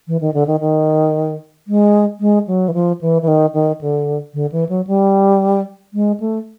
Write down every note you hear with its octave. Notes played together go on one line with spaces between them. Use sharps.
E3
D#3
D3
D#3
D#3
G#3
G#3
F#3
E3
F3
E3
E3
D#3
D#3
D3
D3
E3
F#3
G3
G#3
A3